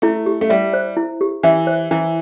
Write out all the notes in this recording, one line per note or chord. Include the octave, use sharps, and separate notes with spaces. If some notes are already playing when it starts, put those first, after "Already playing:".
A3 E4
G4
A3
G3 E5
C5
E4
G4
E3 E5
C5
E3 E4